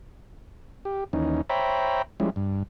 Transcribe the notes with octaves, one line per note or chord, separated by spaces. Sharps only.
G4
D#2 E3 C#4 D#4
C5 C#5 E5 G5 A#5 B5
F3 G3 G#3 C#4 E4
G2